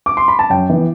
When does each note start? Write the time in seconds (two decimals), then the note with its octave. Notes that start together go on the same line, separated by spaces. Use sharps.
0.06 D6
0.17 C6
0.28 B5
0.39 A5
0.50 F#2 G5
0.70 E3 B3